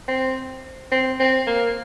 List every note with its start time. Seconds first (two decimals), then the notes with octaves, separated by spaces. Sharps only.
0.08 C4
0.92 C4
1.20 C4
1.47 A#3